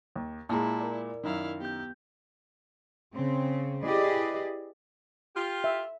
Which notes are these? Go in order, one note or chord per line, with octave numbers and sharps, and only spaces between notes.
D#2
A#2 G#3 E4 A5 A#5
A#4 D5
F#2 D#3 E4 F5
B3 G4 G6
C#3 C4
E4 G4 G#4 B4 D5 D#5
F4 G4
E5